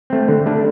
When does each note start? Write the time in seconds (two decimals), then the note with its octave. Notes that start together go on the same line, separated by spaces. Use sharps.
0.10 A3 C4
0.28 D3
0.46 A3 D4